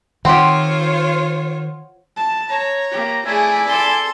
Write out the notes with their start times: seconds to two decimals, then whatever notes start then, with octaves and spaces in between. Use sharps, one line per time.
0.25 D#3 C4 F4 G4 C5 C#5 F#5 C6
2.17 A5
2.49 C#5 A#5
2.91 A#3 G4
3.26 A3 E4 G#4 D5 G#5
3.68 A4 C6